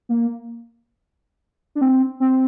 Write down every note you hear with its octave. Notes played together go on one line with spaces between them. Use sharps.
A#3
D4
C4
C4